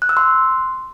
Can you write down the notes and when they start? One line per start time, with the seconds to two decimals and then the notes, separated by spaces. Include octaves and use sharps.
0.02 F#6
0.09 E6
0.17 C6